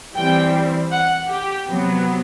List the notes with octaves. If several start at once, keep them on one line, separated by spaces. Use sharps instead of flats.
E3 G3 C4 G5
F#5
G4
C3 F#3 B3